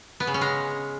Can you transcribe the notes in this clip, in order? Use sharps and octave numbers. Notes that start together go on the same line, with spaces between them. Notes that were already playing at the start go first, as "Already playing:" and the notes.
B3
C#3
C#4
G#3